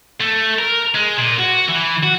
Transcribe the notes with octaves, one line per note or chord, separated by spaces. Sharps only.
A3
A#4
G#3
A#2
F#4
E3
F#4